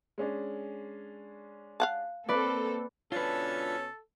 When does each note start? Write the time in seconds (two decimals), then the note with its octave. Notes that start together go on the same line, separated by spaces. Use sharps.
0.18 G#3 C#4 D4
1.80 F5 F#5 A5
2.29 A#3 C4 A4 B4 D5
3.12 B2 C#4 D4 F4 A4 B4 E6